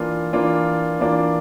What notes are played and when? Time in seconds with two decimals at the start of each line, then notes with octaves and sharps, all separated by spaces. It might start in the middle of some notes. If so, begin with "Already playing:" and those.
Already playing: E3 A#3 D4 F4
0.33 E3 A#3 D4 F4
0.99 E3 A#3 D4 F4